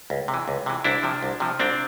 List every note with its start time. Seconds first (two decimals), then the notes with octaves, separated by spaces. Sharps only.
0.10 C#2
0.28 C3
0.34 E3
0.48 C#2
0.66 C3 E3
0.84 C2 D4 E4
1.03 C3 F3
1.23 C2
1.40 C3 F3
1.60 C2 C4 D4